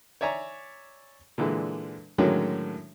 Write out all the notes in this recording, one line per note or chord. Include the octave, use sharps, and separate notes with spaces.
C#5 D5 E5 G#5 A#5 C#6
A#2 D3 E3 G#3
A2 D3 D#3 F#3 G#3 C#4